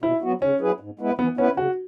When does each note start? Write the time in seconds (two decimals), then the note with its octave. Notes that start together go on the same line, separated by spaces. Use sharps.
0.02 B2 E4
0.22 F#3 B3 F#4
0.41 C#3 C#4
0.61 F#3 E4 G#4 B4
0.80 G#2
0.99 G#3 B3 E4 B4
1.19 E3 B3
1.37 B3 C#4 E4 B4
1.57 C#3 F#4